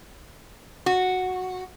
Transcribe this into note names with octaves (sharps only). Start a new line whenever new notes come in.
F#4